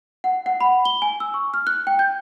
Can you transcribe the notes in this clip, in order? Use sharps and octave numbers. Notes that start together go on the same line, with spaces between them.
F#5
F#5
B5
G7
G#5
E6
C#6
F6
F#6
G5
G6